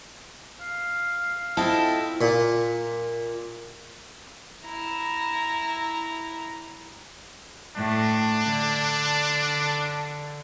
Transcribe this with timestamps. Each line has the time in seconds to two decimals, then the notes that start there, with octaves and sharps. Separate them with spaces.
0.61 F5
1.57 C4 E4 F4 A4 D#5 G5 A5
2.21 A#2
4.65 E4 A#5
7.76 A2 D4
8.46 D3